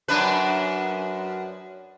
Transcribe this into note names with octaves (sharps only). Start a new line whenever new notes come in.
F#2 D4 B4